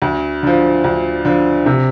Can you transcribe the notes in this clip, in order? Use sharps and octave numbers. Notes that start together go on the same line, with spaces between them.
D2
D3 F3
D2
D3 F3
C3